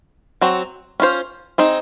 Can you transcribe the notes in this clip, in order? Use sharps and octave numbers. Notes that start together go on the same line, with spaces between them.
F#3 C4 F#4
C#4 F4 C5
C4 D#4 G#4